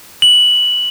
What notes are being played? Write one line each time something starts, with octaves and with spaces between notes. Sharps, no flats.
F#7